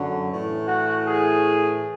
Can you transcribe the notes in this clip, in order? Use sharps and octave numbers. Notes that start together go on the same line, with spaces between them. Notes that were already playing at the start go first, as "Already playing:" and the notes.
Already playing: F#2 D3 F#3
A2 E3
F#4
G#4